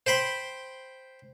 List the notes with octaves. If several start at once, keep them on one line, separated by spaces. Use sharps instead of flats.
C5 G5 B5 C6